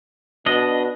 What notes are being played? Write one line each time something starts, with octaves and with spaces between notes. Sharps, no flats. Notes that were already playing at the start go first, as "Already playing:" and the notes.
B2 D4 D#5